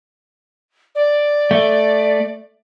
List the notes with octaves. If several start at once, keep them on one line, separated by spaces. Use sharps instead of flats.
D5
A3